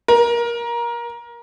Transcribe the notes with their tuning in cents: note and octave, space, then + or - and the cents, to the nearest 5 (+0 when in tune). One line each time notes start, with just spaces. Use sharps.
A#4 +20